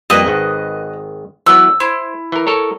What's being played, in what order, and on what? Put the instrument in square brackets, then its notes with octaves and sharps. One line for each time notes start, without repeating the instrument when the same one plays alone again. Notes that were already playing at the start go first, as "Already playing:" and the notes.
[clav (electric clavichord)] F2 G3 A#3 [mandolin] B4 D#5
[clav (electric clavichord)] G#1 D#3
[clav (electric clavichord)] E3 F#3 B3 [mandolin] E6
[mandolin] E4 [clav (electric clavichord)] C5
[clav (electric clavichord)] E3 A#4
A4 A#4 C#5